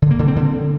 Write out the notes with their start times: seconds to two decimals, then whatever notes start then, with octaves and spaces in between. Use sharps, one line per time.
0.02 D3
0.11 A#3
0.19 D3
0.28 C4
0.36 D3